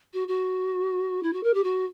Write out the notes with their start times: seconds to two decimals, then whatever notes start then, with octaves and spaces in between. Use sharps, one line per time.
0.14 F#4
0.28 F#4
1.23 E4
1.33 F#4
1.43 A#4
1.54 G4
1.64 F#4